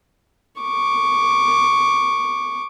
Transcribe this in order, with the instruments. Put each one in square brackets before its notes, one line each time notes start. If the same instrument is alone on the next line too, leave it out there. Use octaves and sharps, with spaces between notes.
[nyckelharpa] C#6 D6